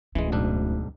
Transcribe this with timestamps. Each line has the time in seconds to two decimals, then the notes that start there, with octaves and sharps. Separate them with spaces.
0.15 D1 D2 E3 G#3 C#4
0.32 B1 G#2 D4